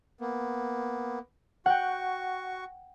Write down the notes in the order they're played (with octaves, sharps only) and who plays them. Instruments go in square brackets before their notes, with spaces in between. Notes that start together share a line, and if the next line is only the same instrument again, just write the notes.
[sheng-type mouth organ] A#3 B3
[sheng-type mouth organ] F#4 C#6 [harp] F#5 G5